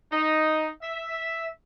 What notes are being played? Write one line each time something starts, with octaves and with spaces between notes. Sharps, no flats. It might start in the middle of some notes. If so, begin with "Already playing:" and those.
D#4
E5